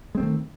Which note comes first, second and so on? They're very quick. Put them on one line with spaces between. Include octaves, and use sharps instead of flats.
G#3 C4 A3 D#3